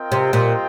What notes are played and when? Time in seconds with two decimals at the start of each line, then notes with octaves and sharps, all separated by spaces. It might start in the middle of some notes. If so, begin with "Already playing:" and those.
Already playing: C4 F4 A#4 D#5 G5
0.12 C3
0.33 A#2